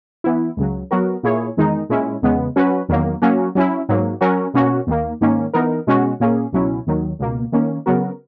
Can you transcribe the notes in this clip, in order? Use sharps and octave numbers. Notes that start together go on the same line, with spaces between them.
E3 B3 E4
C#2 C#3 F#3
F#3 B3 F#4 A#4
A#2 A#3 E4 G#4 C#5
E2 D#3 G#3 D#4
A#2 G#3 C#4 E4
E2 C#3 G#3 B3
F#3 C#4 F#4 B4
E2 D#3 F#3 A#3
F#3 A#3 C#4 F#4
F#3 C#4 E4
G#2 F#3 A#3
F#3 C#4 F#4 A#4
B2 A#3 C#4 F#4
D#2 D#3 A#3
G#2 D#3 A#3 C#4
E3 B3 D#4 A#4
B2 G#3 C#4 F#4
A#2 A#3 C#4 G#4
C#2 B2 F#3 C#4 E4
D#2 D#3 F#3
C#2 B2 A#3
D#3 A#3 C#4
C#3 F#3 B3 F#4 A#4